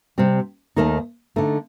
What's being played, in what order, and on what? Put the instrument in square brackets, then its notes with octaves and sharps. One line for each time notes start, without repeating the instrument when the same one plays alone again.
[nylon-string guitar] C3 G3 C4
D#2 D#3 A3 D#4
D3 A3 D#4